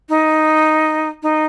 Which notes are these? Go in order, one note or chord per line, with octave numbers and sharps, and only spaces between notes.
D#4
D#4